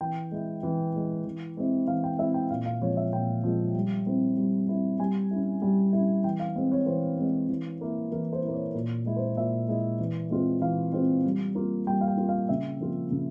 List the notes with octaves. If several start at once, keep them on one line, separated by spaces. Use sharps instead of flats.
E3 G5
G#3 E4
E3
G#3 E4
E3
G#3 C4 E4
E3 F5
G5
G#3 C4 E4 E5
G5
A#2 F5
F5
F3 G#3 C#5
E5
A#2 G5
F3 G#3
G3
C4 E4
G3
C4 E4
G3 G#5
C#4 E4
G3
C#4 E4
E3 G5
F5
G#3 C4
C#5
E3 C5
G#3 C4
E3
A#3 E4
E3 A#4
C5
E4
A#3
C#5
A#2 A#4
G#3 E4
C5
A#2 E5
G#3 E4
E3
G#3 C4 F4
E3 F5
G#3 C4 F4
G3
A#3 F4
G3 G5
F5
G5
A#3 F4
F5
C#3 E5
F3 A#3 F4
C#3